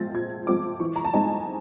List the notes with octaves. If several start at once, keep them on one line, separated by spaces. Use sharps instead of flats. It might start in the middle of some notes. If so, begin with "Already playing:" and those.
Already playing: A#2 F3 G#3 C4 F4 A6 A#6
A#2 G#6
F3 G#3 C4 F4 D6
E3 C#6
A#5
A5
G#3 C4 D#4 G#5